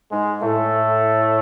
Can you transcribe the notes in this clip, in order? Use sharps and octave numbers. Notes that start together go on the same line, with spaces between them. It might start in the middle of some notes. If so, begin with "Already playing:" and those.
G#2 G#3
A2 A3